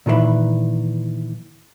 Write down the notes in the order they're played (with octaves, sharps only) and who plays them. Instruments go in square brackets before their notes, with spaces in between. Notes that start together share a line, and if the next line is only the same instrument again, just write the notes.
[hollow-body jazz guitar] A#2 D#3 E3 A#4 E5 B5